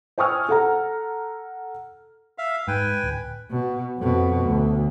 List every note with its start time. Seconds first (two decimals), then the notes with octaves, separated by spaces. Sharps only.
0.18 C5 G5 G#5 C#6 D#6 F6
0.49 A4 F#5 A#5
2.38 E5 F5
2.68 G#2 B4 G5 G#5
3.04 D1
3.50 B2
3.98 F2 B2
4.44 D2